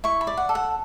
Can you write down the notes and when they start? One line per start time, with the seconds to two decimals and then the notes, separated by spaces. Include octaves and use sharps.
0.04 E4 C#6
0.21 B5
0.27 D5
0.37 F#5
0.49 A4
0.55 F#5